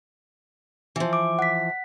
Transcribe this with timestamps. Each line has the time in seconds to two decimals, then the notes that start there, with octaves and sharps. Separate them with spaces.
0.96 E3 F3
1.13 D6
1.39 F#5 B6